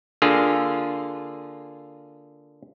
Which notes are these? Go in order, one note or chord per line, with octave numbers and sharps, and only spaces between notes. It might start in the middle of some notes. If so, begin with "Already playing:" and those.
D3 A#3 F4 G#4